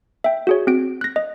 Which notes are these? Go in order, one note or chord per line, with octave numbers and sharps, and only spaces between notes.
E5 G5
F#4 G#4 C#5
C4 F#4 D7
F#6 A#6
D#5